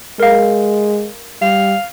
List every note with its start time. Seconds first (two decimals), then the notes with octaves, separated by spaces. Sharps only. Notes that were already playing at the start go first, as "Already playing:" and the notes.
0.20 G#3 A#4 F5
1.42 G3 F5